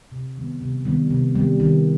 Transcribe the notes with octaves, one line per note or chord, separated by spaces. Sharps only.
C3
D#3 G3 B3
C3
D#3 G3 B3
C3
D#3 G3 B3
D#3